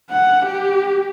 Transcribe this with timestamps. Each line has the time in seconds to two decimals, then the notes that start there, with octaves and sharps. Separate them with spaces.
0.10 F#5
0.46 G4